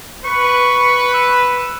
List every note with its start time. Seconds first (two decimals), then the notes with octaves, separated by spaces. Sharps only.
0.25 B4 C#6
1.14 E6